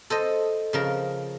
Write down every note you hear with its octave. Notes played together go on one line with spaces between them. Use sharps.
A4 C5 D#5
C#3 F3 A#4